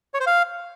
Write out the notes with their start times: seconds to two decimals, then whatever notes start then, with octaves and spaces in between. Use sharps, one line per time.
0.14 C#5
0.20 C5
0.26 F5